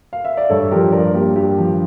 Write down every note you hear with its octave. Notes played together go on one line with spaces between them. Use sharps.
F5
E5
D5
G2 A4 C#5
F3 G4 A#4
G2 A#4 D5
A#3 G4 A#4
G2 G4
F3